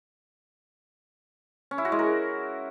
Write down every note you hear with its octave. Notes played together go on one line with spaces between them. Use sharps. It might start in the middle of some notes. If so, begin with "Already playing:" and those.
C#4
E4
F#4
G#3
A#4